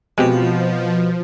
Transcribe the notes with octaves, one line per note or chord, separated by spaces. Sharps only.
B2 F3 G#3 C4 G4